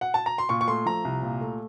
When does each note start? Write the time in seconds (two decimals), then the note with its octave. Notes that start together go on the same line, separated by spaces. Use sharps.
0.01 F#5
0.14 A5
0.26 A#5
0.38 C6
0.49 A#2 C#6
0.61 C#6
0.68 A3 C6
0.86 F3 A#5
1.05 C2
1.23 A#2
1.41 A3